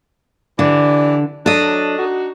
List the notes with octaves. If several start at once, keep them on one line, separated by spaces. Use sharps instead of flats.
D3 E3 G4 D5
F#3 D4 A4 D#5
D4 D#4 F#4